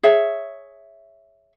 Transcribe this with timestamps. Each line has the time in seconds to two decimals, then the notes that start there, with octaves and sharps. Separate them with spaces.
0.03 G#4 C#5 E5